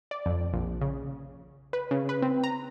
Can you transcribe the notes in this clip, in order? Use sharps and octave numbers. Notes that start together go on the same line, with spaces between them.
D5
F2
A#1
C#3
B4
C#3
B4
C4
A#5